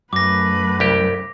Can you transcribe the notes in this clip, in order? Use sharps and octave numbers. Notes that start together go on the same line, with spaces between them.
F#2 A3 B4 D6 A#6
C2 G4